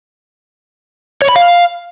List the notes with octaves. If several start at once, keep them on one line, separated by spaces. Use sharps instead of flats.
C#5
B5
F5